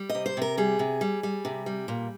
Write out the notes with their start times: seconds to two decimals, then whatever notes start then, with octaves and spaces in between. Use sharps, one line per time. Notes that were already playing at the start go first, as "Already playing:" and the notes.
Already playing: G3
0.10 D#5
0.15 C3
0.26 C5
0.37 C3 A#4
0.58 G3 G#4
0.79 C3
1.01 G3
1.23 G3
1.45 C3
1.66 G3
1.88 A#2